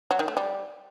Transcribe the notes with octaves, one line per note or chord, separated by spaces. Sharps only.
F#3
D#3
A3
G3